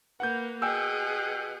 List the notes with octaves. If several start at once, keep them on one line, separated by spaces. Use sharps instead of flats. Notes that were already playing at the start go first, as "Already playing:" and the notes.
A#3 B4 F#5 G6
B2 G#4 G5 G#5 E6